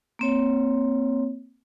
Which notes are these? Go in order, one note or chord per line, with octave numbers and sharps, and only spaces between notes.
A#3 C4 C#5